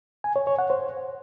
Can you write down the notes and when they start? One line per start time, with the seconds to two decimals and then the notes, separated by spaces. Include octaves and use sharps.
0.24 G#5
0.36 C#5
0.47 C#5
0.59 F#5
0.70 C5